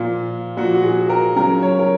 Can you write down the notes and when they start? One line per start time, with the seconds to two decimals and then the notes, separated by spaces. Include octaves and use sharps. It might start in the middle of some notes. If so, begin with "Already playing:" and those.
Already playing: A#2 F3 F4
0.57 A#2 F#4
0.61 F3
0.74 F#4
0.83 G#4
1.09 A#4
1.36 C#3 F#3 A#4
1.62 C#5
1.79 A#4